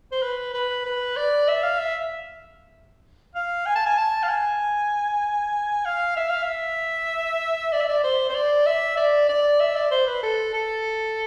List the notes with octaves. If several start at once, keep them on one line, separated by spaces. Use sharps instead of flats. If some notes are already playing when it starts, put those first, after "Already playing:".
C5
B4
B4
B4
D5
E5
F5
E5
F5
G#5
A5
G#5
A5
F5
G#5
F5
E5
F5
E5
D5
E5
D5
C5
C5
D5
E5
D5
D5
E5
D5
C5
B4
A4
A4